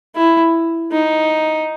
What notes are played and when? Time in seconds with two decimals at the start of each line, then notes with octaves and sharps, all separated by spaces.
0.16 E4
0.92 D#4